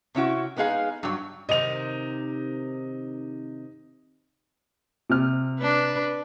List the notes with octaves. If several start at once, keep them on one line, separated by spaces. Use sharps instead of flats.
C3 C#4 E4 F#4
G#3 B3 D#4 G#4 F5
G2 F#3
C3 D#3 D#5 F7
C3 F6
D4 B4